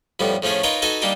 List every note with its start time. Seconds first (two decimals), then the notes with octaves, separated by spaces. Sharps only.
0.20 F2 A2 G3 B3
0.42 A2 F3 A3 C#4 G#4
0.63 D#4 F4 A#4 B4 C#5 D#5
0.82 D#4 F#4 A4 B4 D#5 G#5
1.02 G3 A#3 D4 D#4 G4